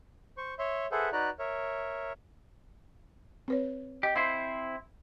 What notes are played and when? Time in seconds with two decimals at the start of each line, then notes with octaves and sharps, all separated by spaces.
0.37 C5 C#6
0.59 C#5 E5 C6
0.91 G#4 A4 B4 C5 E5 F#5
1.12 D#4 F#4 B4 D5 A#5 F#6
1.39 A#4 C#5 E5
3.48 C4 B4 C#5
4.03 G4 D#5
4.16 C4 E4 C5 F5